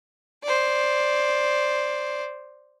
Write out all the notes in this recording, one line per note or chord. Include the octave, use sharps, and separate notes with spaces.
C5 D5